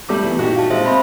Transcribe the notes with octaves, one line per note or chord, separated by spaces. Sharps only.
G3 A3 D6
E3 B3
A#2 D#4 F#4 G4
F5 A5
G#3 C5 E5 A5
C4 F5 B5 C6